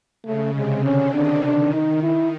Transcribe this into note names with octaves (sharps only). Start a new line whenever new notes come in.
C#3 A3
C3 G#3
D3 C#4
D#3 D4
D#3 D4
D#4
E4